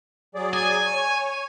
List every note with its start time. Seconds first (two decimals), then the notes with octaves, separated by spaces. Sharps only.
0.35 F#3 G#4 D5
0.53 G#5
0.86 C#5